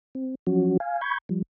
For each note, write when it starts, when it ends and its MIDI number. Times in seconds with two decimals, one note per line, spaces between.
0.15 0.35 60
0.47 0.77 53
0.47 0.77 54
0.47 0.77 61
0.47 0.77 66
0.80 1.01 77
0.80 1.01 80
1.01 1.18 83
1.01 1.18 85
1.01 1.18 91
1.01 1.18 92
1.29 1.42 53
1.29 1.42 55